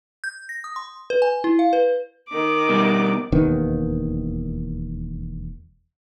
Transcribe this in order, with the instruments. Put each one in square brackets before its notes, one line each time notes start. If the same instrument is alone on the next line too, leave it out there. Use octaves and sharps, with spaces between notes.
[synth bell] G6
A#6
D#6
C6
B4
G#5
E4
F5
B4
[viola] D#3 D6
[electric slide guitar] B2 G3
[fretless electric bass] E1 D#2 D#3 B3